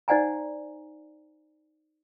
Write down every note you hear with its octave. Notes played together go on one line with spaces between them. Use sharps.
D#4 C5 D5 F#5 G#5 A#5